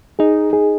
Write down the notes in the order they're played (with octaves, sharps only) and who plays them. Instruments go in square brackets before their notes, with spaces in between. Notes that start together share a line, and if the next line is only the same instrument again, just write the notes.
[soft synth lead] D#4 [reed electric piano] G#4
[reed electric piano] G#4